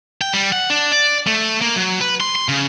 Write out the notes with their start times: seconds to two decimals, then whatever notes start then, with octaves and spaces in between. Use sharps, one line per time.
0.21 G5
0.34 G3
0.52 F#5
0.70 D4
0.92 D5
1.27 A3
1.61 A#3
1.76 F#3
2.01 B4
2.20 C6
2.35 C6
2.49 C#3